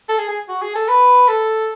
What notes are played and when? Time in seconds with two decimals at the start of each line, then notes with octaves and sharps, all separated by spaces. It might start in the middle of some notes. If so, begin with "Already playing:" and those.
0.09 A4
0.18 G#4
0.29 G#4
0.49 F#4
0.62 G#4
0.75 A4
0.88 B4
1.28 A4